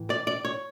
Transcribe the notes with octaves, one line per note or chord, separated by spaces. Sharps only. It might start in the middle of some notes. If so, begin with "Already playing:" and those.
Already playing: A2 E3
D5
D5
C#5